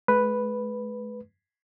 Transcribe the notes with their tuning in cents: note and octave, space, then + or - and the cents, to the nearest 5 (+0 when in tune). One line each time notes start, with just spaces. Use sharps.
G#3 +45 B4 +0